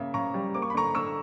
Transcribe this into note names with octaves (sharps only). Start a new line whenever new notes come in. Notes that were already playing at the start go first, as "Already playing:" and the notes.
Already playing: C#3 A#3 E5
C#3 A#5 C#6
G3
A#3 D6
C#6
B5
D3 A#5 C#6
D3 C#6 E6